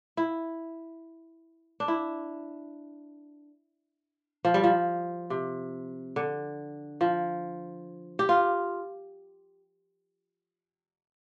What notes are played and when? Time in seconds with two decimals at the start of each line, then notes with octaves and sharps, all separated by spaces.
0.17 E4
1.80 D4
1.88 E4
4.45 F3
4.54 G3
4.64 F3
5.30 C3
6.16 D3
7.01 F3
8.19 G4
8.29 F4